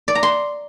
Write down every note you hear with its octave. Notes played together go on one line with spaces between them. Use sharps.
D5
A#5
C6